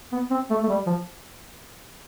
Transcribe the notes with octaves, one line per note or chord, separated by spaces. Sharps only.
B3
C4
A3
A3
G3
F3